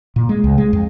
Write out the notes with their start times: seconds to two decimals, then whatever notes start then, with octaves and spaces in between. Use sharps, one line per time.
0.16 A#2
0.29 G#3
0.44 C#2
0.58 G#3
0.73 F2